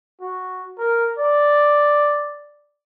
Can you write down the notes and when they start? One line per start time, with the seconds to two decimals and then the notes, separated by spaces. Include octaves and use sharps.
0.21 F#4
0.78 A#4
1.18 D5